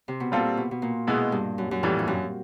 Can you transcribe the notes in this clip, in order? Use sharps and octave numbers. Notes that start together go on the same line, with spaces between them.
C3
B2
A#2 G3 C4 F4 A4
B2
B2
A#2
B2 G#3 B3 E4
G2
F#2
F#2
F2 A2 E3 G3
G2
F#2